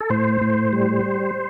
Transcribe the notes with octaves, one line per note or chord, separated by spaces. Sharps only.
A4
A2 C5
A2
G3